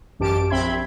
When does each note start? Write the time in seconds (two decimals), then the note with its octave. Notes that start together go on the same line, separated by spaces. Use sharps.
0.19 A1 F#2 G4 A5 D7
0.50 A#1 C4 E5 B5 C6 G#6